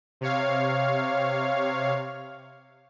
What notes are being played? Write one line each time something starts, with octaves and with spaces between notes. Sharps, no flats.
C3 C#5 F5